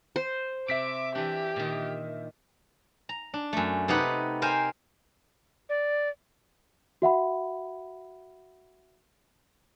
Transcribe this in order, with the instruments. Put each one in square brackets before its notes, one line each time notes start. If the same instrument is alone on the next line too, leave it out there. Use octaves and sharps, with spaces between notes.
[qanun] C5
[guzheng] C3 [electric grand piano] E5 B6 D7 [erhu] D6
[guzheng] E3 D4 [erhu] G4
[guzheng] A#2 D#3
A#5
D4
F#2 A3
C3 B3 D#4 G4 B4 F#5
A#4 C5 F5 G5 G#5
[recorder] D5
[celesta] F#4 E5 F#5 B5